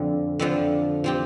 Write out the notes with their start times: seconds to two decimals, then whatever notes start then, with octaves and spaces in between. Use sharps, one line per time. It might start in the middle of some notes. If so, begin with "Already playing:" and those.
Already playing: F2 D3 F3
0.39 F2 D3 F3
1.04 F3 C4 G4